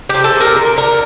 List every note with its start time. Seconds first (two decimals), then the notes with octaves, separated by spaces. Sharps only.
0.09 C3 G4
0.24 A4
0.35 C3
0.41 A#4
0.55 D3 A#4
0.77 D3 A#4